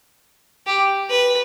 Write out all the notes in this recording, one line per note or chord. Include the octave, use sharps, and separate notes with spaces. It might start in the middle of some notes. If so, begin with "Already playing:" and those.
G4
B4